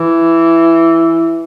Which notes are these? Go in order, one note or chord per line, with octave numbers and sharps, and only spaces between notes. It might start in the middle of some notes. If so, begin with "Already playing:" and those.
Already playing: E3